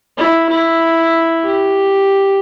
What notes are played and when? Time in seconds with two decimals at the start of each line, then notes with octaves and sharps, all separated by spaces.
0.18 E4
0.49 E4
1.44 G4